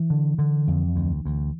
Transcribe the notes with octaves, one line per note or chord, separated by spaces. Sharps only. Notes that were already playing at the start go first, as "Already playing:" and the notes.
Already playing: E3
D3
D3
F2
D2
D2